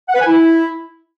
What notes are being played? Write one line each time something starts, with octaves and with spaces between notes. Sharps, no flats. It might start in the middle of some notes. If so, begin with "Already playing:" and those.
F#5
B4
G#5
E4